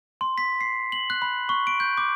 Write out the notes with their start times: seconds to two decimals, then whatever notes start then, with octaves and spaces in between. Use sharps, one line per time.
0.21 C6
0.38 B6
0.61 C7
0.92 F#7
1.10 F#6
1.22 B5
1.49 C#6
1.67 D7
1.80 G6
1.97 D6